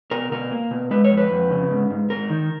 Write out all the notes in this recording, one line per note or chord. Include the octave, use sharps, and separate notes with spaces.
B2 A#4
B2 A#4
A#3
B2
G#3 B4
C#5
F2
B4
F2
C#3
G#2
G#2
G#2 A#4
D#3